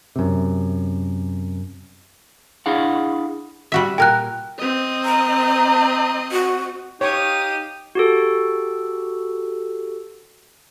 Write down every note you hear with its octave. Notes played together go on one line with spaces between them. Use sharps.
F#2 C3
D4 E4 G#4 F5 F#5
G3 F#4 E5
A#2 A#4 G5 F#6
C4 D#5
A#5
F#4
D#4 G4 C#5 F5 C#6 D#6
F#4 G4 A4